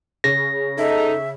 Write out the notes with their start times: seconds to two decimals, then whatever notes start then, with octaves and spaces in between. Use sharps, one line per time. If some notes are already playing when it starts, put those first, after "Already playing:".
0.24 C#3 C#4 A#6
0.78 D#4 A4 E5